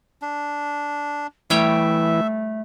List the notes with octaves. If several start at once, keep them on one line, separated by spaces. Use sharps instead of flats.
D4
E3 G3 A3 C#5 E5 G5